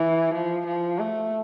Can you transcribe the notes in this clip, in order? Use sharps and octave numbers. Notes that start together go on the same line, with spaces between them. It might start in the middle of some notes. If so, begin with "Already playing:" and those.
Already playing: E3
F3
F3
A3